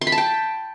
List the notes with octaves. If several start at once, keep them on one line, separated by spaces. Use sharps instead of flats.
C6
B5
A5
G5